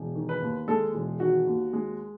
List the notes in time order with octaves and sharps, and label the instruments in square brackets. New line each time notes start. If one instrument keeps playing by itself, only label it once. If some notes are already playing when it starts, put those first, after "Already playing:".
Already playing: [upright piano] E1
D#3
B4
D#2
G#3 A4
E1
D#3 F#4
D#2
G#3